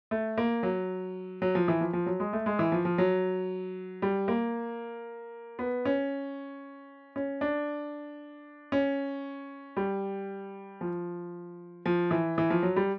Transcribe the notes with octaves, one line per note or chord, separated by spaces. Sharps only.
A3
A#3
F#3
F#3
F3
E3
F3
F3
F#3
G#3
A3
G#3
E3
F3
F3
F#3
G3
A#3
B3
C#4
C#4
D4
C#4
G3
F3
F3
E3
E3
F3
F#3
G3